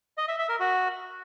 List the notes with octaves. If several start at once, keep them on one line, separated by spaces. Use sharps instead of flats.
D#5
E5
E5
A#4
F#4